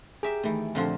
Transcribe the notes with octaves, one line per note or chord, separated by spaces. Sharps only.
G4 G#4 A#4 E5
D#3 E3 A3
F2 A#2 D3 F3